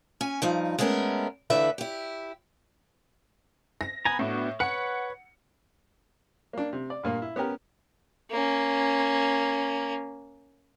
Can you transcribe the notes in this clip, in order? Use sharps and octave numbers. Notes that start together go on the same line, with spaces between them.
C#4 G#5
G2 F3 D#4
G#3 A3 B3 C#4 A4 A#4
D#2 D3 E3 A3 B4 E5
E4 G4
A#6
B3 G#5 A#5 B5
A2 B3 D4 F#4
B4 C#5 F#5 C#7
A#3 D4
C3
D5
G2 A#2 A#3
E4
B3 C#4 G4 A#4
A#3 C#4